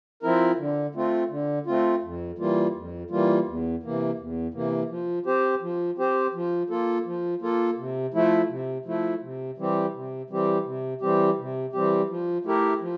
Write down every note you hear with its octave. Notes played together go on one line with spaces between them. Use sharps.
F3 C4 E4 A#4
D3
A3 C4 F4
D3
A3 C4 F4
F2
E3 G3 A#3 F4
F2
E3 G3 A#3 F4
E2
C3 E3 A#3
E2
C3 E3 A#3
F3
C4 G4 C5
F3
C4 G4 C5
F3
A#3 F4 A4
F3
A#3 F4 A4
C3
F3 A3 E4
C3
F3 A3 E4
C3
E3 G3 C4 G4
C3
E3 G3 C4 G4
C3
E3 G3 C4 G4
C3
E3 G3 C4 G4
F3
A3 E4 G4 A#4
F3